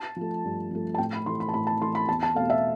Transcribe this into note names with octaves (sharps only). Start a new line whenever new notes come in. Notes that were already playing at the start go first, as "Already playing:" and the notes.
Already playing: A5
F3 A3
G2
F3 A3
A5
A2 G5
B5
E3 A3 C6
B5
A5
A2 B5
A5
E3 A3 C6
B5
E2 A5
A5
B2 A3 F5
E5